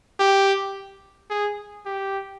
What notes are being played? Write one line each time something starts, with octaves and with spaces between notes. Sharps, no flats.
G4
G#4
G4